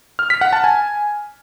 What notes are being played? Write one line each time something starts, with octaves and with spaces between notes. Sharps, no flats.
F6
B6
F#5
A5
G#5